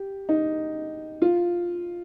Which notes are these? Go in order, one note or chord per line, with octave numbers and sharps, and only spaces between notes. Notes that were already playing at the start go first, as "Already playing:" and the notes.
Already playing: G4
D#4
F4